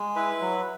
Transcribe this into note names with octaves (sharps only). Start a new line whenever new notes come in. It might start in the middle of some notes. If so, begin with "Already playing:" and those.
Already playing: G#3
E4 B4
F#3